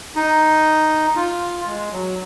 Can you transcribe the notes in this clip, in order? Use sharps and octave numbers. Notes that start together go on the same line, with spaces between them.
D#4
F4
G#3
F#3